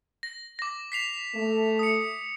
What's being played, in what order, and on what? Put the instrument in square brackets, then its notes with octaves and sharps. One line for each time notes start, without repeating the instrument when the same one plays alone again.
[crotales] A#6
D6 A#6
B6 C7 F7
[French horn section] A3
[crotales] D#6 C#7